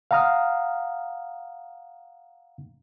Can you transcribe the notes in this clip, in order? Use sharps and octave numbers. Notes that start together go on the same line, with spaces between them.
F5 F#5 A#5 D#6 F6